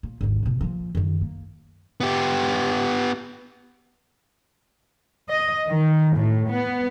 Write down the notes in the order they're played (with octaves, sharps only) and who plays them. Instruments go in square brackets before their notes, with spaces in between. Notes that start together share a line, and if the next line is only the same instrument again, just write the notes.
[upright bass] A#2
G#1 D#2
F2 B2
A#2 F3
F#2 D#3
A#3
[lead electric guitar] B3 G4
[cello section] D#5
D#3
A2
B3